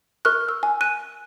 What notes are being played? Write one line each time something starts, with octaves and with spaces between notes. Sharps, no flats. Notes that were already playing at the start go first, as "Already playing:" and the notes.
A#4 C#6 F6 F#6
E6
G#5
F#6 D#7